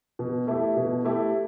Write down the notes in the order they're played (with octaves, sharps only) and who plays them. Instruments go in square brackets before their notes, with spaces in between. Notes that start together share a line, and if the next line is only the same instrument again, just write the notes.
[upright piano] B2
A3 E4 G4
B2
A3 E4 G4